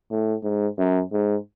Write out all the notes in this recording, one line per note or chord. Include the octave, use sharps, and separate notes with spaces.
A2
G#2
F#2
G#2